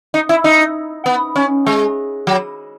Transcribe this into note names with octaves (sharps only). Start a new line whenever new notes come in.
D#4
E4
D#4
B3
C#4
G#3
F#3